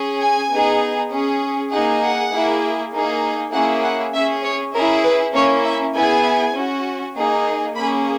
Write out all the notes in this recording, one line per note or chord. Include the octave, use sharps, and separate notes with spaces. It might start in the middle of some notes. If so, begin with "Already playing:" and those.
Already playing: C#4 G#4
G#5
B3 D#4 G#4
C#4 G#4
A#3 D#4 G#4 F#5
F#5
A#3 E4 G#4
A#3 D#4 G#4
A#3 C#4 E4 G#4 F#5
F#5
C#4 G#4 E5
C#5
C#4 E4 G#4 A#4
B4
A#3 C#4 E4 C#5
E5
B3 E4 G#4 G#5
C#4 F#4
A#3 D#4 G#4
A#3 C#4 G#4 B5